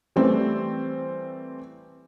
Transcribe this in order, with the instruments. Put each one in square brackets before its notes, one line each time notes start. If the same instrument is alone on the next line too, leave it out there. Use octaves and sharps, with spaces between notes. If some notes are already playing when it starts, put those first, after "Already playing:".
[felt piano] E3 G3 A3 C4